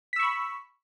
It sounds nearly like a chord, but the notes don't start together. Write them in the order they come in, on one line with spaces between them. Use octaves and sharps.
B6 E6 C#6 B5